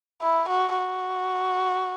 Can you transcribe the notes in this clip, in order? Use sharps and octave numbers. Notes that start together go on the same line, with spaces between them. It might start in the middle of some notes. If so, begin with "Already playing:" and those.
E4
F#4
F#4